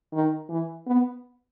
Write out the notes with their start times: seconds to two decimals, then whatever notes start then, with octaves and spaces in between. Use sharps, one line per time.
0.13 D#3
0.49 E3
0.87 B3